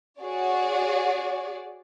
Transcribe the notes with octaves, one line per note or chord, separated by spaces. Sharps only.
F#4 G#4 C#5 D5